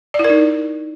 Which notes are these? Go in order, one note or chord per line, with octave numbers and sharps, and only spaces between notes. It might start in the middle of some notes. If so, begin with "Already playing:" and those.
D5
E4
A#4
D#4